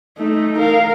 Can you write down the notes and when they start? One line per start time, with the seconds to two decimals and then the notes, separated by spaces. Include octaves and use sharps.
0.18 A3 D#4
0.58 A#4 F5